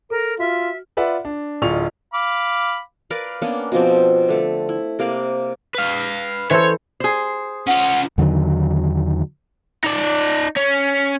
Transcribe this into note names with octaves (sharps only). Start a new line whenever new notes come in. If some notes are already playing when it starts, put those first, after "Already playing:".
A4 A#4 C5 A#5
F4 F#4 E5 F6
F4 B4 D5 E5 F#5
D4
D1 F4 G#4 D5 C#6 F7
F5 B5 D6
A#4 B4 D5 F5
A#3 B3 C#4 D4
B2 F3 C4
D3 A3
E4
C3 A#3 D5 F5
B4 F5
E3 A4 C5 C#5
G#4 C5
C#4 F4 F#5
E2 D3 D#3 F#3
D#4 D5
C#4